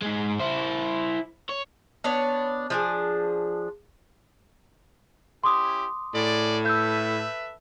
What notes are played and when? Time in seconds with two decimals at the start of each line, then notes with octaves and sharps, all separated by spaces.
0.02 G#2 G#3
0.39 E4 C5
1.49 C#5
2.04 B3 D4 C#5
2.70 F3 D4 G#4
5.44 C#4 E4 G4 C6 D6 D#6
6.15 A2 G#4 D5
6.66 A4 B4 E5 E6 G6